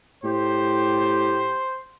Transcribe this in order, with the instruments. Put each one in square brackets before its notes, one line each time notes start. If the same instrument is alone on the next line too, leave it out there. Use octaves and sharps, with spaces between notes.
[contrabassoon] A2 [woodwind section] G4 [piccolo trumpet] C5